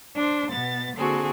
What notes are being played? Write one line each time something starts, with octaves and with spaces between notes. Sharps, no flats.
D4 C5
B2 B3 A6
D3 A#3 C4 F#4 G#4 A4